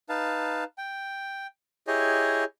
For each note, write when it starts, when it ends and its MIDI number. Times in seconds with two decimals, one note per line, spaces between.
0.09 0.64 63
0.09 0.64 71
0.09 0.64 77
0.09 0.64 81
0.78 1.47 79
1.87 2.44 64
1.87 2.44 67
1.87 2.44 68
1.87 2.44 73
1.87 2.44 75